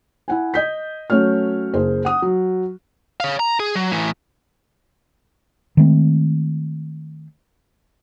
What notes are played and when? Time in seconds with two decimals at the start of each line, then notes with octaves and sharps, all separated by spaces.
0.28 E4 F#5 G#5
0.54 D#5 G6 B6
1.10 F#3 A3 C#4 C#5 F6
1.74 F#1 G#4 C5
2.05 F#5 D#6
2.22 F#3
3.20 C#5 F5
3.39 A#5
3.60 G#4
3.75 F#3
3.91 A2 E3
5.77 D#3 G#3 A3 C4